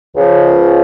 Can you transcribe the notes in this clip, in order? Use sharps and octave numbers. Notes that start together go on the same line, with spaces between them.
C#2 C#3 F3